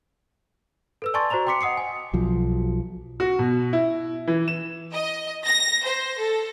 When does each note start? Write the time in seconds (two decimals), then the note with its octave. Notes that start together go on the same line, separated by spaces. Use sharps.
1.02 A4 B4 E6
1.14 D5 G#5 A5 C6 C#6 A6
1.30 F#4 C5 D5 A#5 F7
1.47 G5 C6 D6 B6 C#7
1.61 D#5 F#5 D#6 C7 C#7
1.77 G#5
2.13 B1 F3 F#3
3.20 F#4
3.39 B2
3.73 E4
4.27 E3
4.48 E7
4.93 D#5
5.46 A#6
5.85 C5
6.19 A4